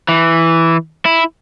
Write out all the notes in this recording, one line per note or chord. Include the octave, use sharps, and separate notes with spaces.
E3
E4